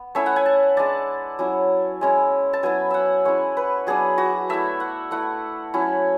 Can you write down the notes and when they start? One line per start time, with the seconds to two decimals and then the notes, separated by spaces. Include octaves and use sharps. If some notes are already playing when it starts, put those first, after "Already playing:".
Already playing: B3
0.15 A3 C#4 E4 E5
0.26 F#5
0.36 G#5
0.46 A5
0.77 G#3 D4 A5
1.39 F#3 C#4 E4
2.01 G#3 C#4 E4
2.53 A5
2.63 F#3 B3 E4 G#5
2.90 E5 F#5
3.25 G#3 C#4 E4 C#5
3.57 B4
3.87 F#3 B3 D4 G#4
4.18 F#4
4.49 A3 E4 E5
4.80 F#5
5.11 A3 E4 F#5
5.74 F#3 C#4 E4